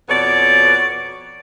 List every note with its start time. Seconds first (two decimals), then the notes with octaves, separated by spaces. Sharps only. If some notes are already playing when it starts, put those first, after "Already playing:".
0.09 F2 B2 B3 C#5 D5